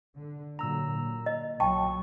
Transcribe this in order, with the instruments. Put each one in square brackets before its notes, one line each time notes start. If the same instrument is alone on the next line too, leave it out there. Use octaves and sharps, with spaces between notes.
[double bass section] D3
[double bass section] A#2 D3 F#3 [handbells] A#5 E6
[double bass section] A#2
[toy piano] D#5
[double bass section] B1 A#2 F#3 [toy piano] G5 A5 [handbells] C#6